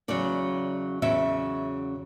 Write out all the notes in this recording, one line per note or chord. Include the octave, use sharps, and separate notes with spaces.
E2 C#3 F#3 D5
E2 C#3 F#3 E5